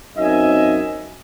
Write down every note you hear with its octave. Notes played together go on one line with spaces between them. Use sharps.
F#2 C4 D#4 D#5 E5 G#5